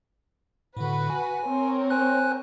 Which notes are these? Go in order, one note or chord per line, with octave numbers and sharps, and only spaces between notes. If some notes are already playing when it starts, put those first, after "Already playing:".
A2 D3 F#4 B4
G#5
C4 A#4 C#5
C5 G#5 F#6